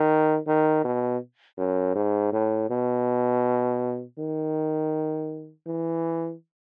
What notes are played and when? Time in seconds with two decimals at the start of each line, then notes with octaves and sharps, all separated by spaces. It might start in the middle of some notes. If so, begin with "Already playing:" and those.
Already playing: D#3
0.47 D#3
0.84 B2
1.58 F#2
1.96 G#2
2.33 A2
2.70 B2
4.18 D#3
5.67 E3